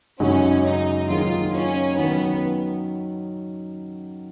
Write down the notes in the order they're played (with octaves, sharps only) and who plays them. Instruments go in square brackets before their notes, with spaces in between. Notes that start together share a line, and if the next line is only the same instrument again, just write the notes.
[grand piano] F#2 C#3 G#3 D#4 F#4 [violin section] C#4
[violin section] D#4
[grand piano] D#3 F#3 A#3 D#4 G#4 [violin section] F4
[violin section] C#4
[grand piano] D#3 F#3 C#4 [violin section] B3